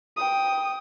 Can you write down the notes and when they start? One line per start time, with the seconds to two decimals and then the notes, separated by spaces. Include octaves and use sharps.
0.17 G5 D#6